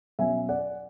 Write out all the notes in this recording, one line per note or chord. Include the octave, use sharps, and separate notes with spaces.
B2 F#3 C#4 E5 G#5
D5 F#5